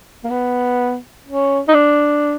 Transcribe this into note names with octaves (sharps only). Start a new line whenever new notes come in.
A#3
B3
C#4
D#4
D4